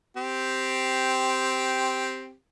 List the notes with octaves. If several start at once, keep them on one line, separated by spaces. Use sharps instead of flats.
C4 G4